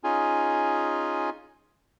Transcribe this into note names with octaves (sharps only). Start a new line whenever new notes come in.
C#4 D#4 F4 G#4 G#5